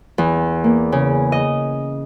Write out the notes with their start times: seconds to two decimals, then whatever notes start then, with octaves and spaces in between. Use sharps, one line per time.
0.18 E2
0.64 A#3
0.92 C#3
1.32 D#5